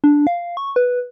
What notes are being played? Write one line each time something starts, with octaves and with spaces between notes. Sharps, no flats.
D4
F5
C#6
B4